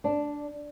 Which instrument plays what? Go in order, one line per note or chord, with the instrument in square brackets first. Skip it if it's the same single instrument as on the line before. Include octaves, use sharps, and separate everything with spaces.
[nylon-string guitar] D4